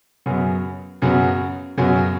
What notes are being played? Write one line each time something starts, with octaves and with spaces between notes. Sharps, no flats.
F#2 C#3 F#3 B3 F#4
F#2 C#3 F#3 B3 F#4
F#2 C#3 F#3 B3 F#4